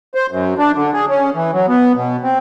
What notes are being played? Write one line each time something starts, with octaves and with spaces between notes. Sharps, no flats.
C5
F#2
D4
D3
G#4
C#4
E3
F#3
B3
B2
C4